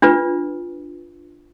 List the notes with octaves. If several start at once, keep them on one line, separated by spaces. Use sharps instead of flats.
D4 F4 B4